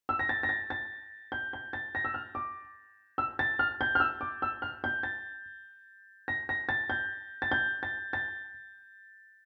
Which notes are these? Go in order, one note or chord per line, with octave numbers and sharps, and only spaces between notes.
E6
A#6
A6
A#6
A6
A6
G6
G6
A6
A#6
E6
F6
D6
E6
A6
F6
G6
F6
E6
D6
E6
F6
G6
A6
A#6
A#6
A6
G6
A6
G6
A6
A6